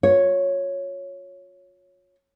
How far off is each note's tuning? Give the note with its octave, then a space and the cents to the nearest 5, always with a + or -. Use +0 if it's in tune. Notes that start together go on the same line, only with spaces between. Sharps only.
F4 +40 C#5 +0